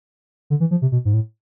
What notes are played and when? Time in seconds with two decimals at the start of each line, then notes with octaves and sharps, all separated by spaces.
0.50 D3
0.60 E3
0.71 F3
0.82 C3
0.92 B2
1.05 G#2
1.14 A2